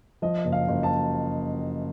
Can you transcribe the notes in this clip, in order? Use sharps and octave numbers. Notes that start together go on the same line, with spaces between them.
F3 D#5
F#1
F5
F#1
A5